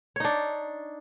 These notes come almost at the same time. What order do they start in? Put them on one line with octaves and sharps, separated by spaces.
C#5 D#4 D4